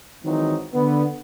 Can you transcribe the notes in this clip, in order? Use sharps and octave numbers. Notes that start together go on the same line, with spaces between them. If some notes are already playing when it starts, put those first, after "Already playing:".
D#3 E3 F#3 G#3 C4 D#4
D3 B3